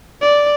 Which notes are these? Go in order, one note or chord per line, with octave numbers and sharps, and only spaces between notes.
D5